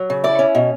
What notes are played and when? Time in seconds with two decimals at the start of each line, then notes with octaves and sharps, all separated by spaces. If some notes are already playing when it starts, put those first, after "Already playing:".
Already playing: F#3
0.10 C#3
0.24 E4 D5
0.39 C#4
0.55 B2